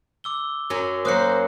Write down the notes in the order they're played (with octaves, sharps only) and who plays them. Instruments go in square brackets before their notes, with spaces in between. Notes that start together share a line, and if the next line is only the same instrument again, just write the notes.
[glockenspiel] D6 E6 G7
[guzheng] F#2 F#3 C#4
[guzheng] F#3 A#3 [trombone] C5 [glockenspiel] D#6 F#6 C#7